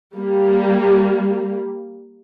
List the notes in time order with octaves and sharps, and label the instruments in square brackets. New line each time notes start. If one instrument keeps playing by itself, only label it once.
[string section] G3 A#3